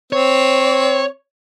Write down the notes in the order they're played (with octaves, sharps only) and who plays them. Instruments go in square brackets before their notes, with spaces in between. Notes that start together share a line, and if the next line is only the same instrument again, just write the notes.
[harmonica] C4 [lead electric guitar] C#5